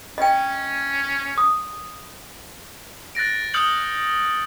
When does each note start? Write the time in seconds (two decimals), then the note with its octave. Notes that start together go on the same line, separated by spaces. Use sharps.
0.18 C#4 D#5 G5
1.38 D#6
3.15 F#6 A6 A#6 D7
3.54 D#6 F6 G6 C#7 F#7